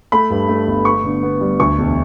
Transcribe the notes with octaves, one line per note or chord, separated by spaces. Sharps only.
A3 B5
G2
A3
G1
B3 C#6
D3
B3
G3
D2 C#6
E1